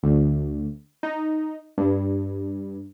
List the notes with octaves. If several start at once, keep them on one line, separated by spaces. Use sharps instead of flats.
D2
D#4
G2